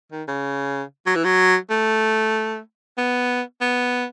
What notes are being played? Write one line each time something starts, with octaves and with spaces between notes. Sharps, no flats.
D#3
C#3
F#3
E3
F#3
A3
B3
B3